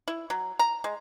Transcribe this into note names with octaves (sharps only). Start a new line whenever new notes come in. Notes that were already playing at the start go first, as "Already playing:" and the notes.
E4
F#3
A#5
G#3